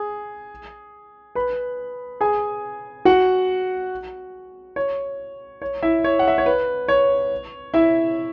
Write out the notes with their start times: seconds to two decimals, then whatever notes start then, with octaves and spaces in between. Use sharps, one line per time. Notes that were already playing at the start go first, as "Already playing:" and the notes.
Already playing: G#4
1.35 B4 B5
2.21 G#4 G#5
3.05 F#4 F#5
4.76 C#5
5.62 C#5
5.83 E4 E5
6.04 C#5
6.19 F#5
6.28 E5
6.38 C#5
6.46 B4
6.88 C#5
7.74 E4 E5